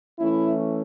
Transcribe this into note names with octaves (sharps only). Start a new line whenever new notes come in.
E3 A3 C#4 E4